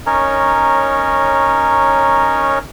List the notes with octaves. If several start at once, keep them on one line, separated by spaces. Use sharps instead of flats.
C#4 D#4 A#4 C#5